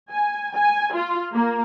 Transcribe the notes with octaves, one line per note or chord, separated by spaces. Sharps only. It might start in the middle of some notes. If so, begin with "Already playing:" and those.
G#5
G#5
F4
A#3